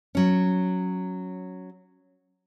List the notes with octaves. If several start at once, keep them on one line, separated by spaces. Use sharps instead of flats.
F#3 C#4